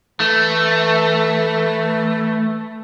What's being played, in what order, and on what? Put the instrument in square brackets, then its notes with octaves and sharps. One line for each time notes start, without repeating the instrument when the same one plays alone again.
[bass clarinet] E3 [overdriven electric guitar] A3